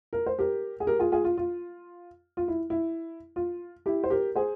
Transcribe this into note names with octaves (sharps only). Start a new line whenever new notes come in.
A#4
C5
G4 A#4
G#4
G4 A#4
F4 G#4
F4 G#4
F4
F4
F4
E4
E4
F4
E4 G4
C5
G4 A#4
G#4 C5